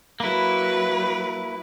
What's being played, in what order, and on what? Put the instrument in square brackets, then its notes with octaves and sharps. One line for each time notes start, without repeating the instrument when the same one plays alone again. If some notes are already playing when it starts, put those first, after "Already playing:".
[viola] F#3 B4 [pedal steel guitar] A#3 E4